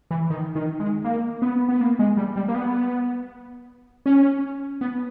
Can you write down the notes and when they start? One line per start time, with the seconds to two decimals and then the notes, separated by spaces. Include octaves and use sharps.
0.11 E3
0.30 D#3
0.55 D#3
0.80 G#3
1.04 A#3
1.42 B3
1.69 B3
1.81 A#3
1.99 G#3
2.17 G3
2.36 G3
2.48 A#3
2.55 B3
4.06 C#4
4.81 B3